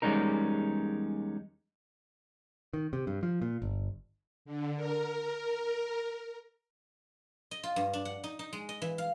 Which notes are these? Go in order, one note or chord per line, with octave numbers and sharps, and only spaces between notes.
E2 G3 G#3 C#4 D#4 A#4
D#3
C3
G2
F3
A#2
G1
D3
A#4
D#5
F4
G2
D4
F#5
D#4
D#4
G#3
D#5
E3
F5